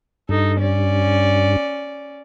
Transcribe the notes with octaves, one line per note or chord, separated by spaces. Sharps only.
G2 D#4 A4
C#4 D5